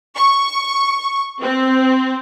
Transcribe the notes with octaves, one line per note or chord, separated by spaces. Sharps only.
C#6
C4